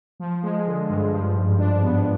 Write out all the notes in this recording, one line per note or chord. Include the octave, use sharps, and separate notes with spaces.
F3
G#3
D3
G2
F3
G#2
D4
B3